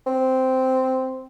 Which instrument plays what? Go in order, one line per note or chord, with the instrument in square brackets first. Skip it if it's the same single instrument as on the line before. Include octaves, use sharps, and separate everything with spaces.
[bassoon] C4